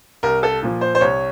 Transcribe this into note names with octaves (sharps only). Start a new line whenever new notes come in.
C2 A#4
A4
A#2 F3
C5
C5
C2 C#5